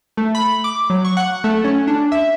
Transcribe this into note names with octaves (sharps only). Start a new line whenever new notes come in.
A3
B5
D6
F#3
C#6
F#5
A3
C#4
D4
E5